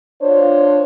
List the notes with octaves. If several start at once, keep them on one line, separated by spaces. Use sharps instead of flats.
D4 F4 C5 C#5